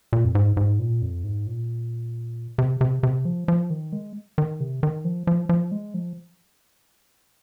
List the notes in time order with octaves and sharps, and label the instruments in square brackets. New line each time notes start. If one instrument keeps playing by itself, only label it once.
[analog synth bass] A#2
F2
G#2
G#2
A#2
F2
G#2
A#2
C3
C3
C3
F3
F3
D#3
G#3
D#3
C3
D#3
F3
F3
F3
G#3
F3